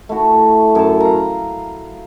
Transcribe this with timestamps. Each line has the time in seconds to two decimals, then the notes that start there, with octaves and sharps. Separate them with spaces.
0.09 A3 E4 F#4
0.75 F#2 A4 A5
1.00 F5 A#5